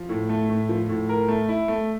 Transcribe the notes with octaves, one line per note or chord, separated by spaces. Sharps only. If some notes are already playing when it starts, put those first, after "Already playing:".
Already playing: F3
A2
A3
A2
F3
A2
A#4
A3
E4
A3